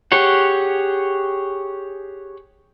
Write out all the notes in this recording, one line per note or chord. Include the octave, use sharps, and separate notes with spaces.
G4 G#4 C#5 F#5